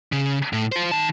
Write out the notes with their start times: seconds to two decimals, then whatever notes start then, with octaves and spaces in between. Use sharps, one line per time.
0.12 C#3
0.53 A2
0.72 F4 C5
0.91 D#3 A5